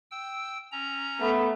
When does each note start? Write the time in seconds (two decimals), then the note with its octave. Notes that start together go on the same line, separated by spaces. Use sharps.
0.11 G5 E6
0.72 C#4 A#5
1.20 A3 B3